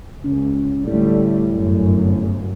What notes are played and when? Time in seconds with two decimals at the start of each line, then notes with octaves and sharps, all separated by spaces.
0.24 C#2 C#4
0.87 A2 D3 G3 A3
1.53 G1 F#2